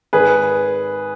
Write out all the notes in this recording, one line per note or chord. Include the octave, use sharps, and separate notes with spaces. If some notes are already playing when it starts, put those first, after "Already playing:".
G#1 G#4 B4